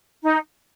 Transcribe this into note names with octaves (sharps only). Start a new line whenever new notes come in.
D#4